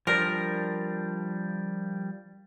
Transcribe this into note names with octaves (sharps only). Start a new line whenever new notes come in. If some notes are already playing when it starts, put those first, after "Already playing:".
F3 G3 D4 A#4